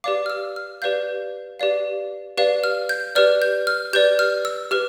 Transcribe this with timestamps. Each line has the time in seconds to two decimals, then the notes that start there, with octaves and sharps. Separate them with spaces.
0.04 G4 B4 D5 F5 D6
0.26 F6
0.30 E6
0.56 F6
0.82 G4 B4 D5 F5 G6
1.60 G4 B4 D5 F5
2.37 G4 B4 D5 F5
2.64 F6
2.89 G6
3.15 G4 B4 D5 F6
3.42 G6
3.67 F6
3.93 G4 B4 D5 G6
4.19 F6
4.45 E6
4.71 G4 B4 F6